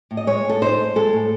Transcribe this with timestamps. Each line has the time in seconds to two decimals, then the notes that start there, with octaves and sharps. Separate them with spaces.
0.11 A2
0.17 D#5
0.27 G#3 C#5
0.45 A2 A4
0.62 D#4 C5
0.79 A2
0.95 G#3 A4
1.13 A2